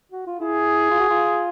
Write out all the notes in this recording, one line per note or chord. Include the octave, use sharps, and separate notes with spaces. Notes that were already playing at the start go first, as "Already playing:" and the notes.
F#4
F4
E4 G#4
F4
F#4
F4